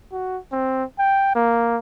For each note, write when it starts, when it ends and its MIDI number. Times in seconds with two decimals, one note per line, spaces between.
0.12 0.38 66
0.52 0.84 60
0.99 1.33 79
1.35 1.79 58